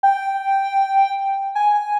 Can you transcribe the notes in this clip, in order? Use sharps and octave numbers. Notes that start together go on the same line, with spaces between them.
G5
G#5